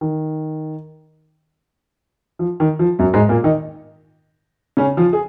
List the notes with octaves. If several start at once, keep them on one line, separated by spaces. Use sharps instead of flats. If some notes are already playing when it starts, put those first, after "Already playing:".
D#3
F3
D#3
F3
F#2 F#3
G#2 G#3
A#2 A#3
D#3 D#4
C#3 C#4
F3 F4
G#4